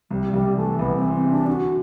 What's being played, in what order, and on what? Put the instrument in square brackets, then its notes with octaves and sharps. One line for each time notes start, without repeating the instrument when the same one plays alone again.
[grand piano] C2 [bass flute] G3
[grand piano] C2 [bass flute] G3
[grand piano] E3 [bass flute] A3
[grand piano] C2 [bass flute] B3
[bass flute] C4
[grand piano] E3
[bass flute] C4
[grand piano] C3
[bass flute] D4
[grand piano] D3 [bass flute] F#4